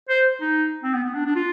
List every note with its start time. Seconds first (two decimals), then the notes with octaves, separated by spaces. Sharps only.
0.09 C5
0.41 D#4
0.83 C4
0.94 B3
1.04 B3
1.15 D4
1.25 D4
1.35 F4